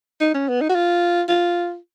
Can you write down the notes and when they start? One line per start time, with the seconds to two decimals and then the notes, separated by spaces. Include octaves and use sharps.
0.21 D#4
0.34 C#4
0.49 B3
0.61 D#4
0.69 F#4
0.75 F4
1.29 F4